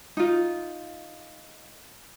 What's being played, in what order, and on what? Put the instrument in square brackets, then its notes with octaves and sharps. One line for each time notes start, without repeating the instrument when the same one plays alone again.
[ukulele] D#4 F4